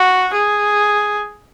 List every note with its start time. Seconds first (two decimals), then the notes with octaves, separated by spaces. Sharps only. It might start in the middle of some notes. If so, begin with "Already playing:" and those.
Already playing: F#4
0.33 G#4